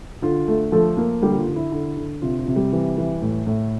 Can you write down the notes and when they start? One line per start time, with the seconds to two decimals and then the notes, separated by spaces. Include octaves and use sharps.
0.22 D3 F4
0.48 A3
0.72 F3 A3 A4
0.97 A#3
1.22 D3 G3 G4
1.32 G4
1.39 F4
1.48 D3
1.56 E4
1.72 D3
1.97 D3
2.22 C3 F4
2.39 F4
2.48 C3
2.56 G3 G4
2.73 E3
2.98 E3
3.22 A2
3.47 A2